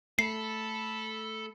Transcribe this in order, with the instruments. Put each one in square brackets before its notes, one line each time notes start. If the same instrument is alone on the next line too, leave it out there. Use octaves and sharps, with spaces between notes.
[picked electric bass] A3 [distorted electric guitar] A4 [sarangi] B5 [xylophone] C7